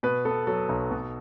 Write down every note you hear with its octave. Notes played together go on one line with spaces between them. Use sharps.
B2 B4
B3 A4
F#3 A4
B1
B2